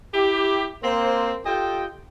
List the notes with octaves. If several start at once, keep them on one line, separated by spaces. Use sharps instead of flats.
E4 G4
A#3 C4 C5
F4 G4 A4 D#5 G5